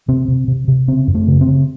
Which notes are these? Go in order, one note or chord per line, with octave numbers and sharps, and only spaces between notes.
C3 C4
C3
C3
C3
C#3 C4
F#2
A3
C#3
C4
C#3